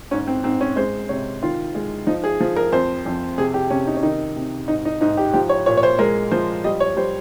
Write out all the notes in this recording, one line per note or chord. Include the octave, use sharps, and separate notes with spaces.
G#2 C#4
C4
G#2 C4
C#4
G#3 C5
C3 C#5
D#3 F4
G#3
F3 D#4
G#4
F3
A#4
F2 C5
F2
C3 G#4
G4
C3 C#4
D#4
C#4
D#3 D#4
C3
G#2 D#4
D#4
G#2 D#4
G4
F3 G4
C#5
A#2 C#5
C#5
C5
G#3 A#4
F3 C5
G3 D#5
C#5
G3 C5